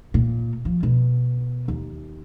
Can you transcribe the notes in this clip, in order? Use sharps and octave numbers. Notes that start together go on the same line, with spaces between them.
A#2
F3
B2
D#2